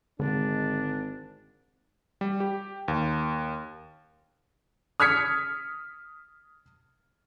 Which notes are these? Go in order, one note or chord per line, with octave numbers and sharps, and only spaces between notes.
G#1 D3 G#3 D4
G3
G4
D#2
D#6 F6 G#6 B6 C#7